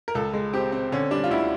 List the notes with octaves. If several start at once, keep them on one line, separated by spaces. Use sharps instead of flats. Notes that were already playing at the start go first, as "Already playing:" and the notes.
A#4
C#2 A4
G#3
C4 G4
C4
D3 C#4
G3 D4
F4
D2 E4